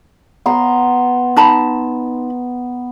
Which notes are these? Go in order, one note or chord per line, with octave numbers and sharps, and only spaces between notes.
B3 A#5 C6
D#4 A5 B5